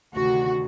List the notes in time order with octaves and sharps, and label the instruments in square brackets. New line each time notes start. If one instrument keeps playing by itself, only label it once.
[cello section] D2 C3 D#3 F#4